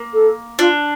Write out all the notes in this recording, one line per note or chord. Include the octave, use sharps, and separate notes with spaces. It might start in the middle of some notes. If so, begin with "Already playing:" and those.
Already playing: A#3
A4
D4 F4